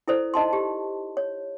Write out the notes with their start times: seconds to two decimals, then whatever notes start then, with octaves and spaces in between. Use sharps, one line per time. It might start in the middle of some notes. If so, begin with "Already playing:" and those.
0.08 E4 A4 C5 D5
0.34 D#4 D#5 A5 C6
0.53 G4
1.17 C#5